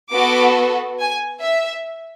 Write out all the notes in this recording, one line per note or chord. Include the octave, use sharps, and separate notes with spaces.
B3 F#4 A4 D6
G#5
E5